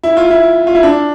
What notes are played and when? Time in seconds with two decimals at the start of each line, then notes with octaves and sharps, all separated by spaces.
0.03 E4
0.17 F4
0.31 E4
0.67 F4
0.75 E4
0.83 D4